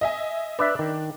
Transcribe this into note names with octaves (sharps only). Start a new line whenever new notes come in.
D#5 E5 G#5
D4 B4 D5 E5
D#3